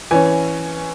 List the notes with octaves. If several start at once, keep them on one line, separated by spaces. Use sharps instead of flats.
E3 C#4 G#5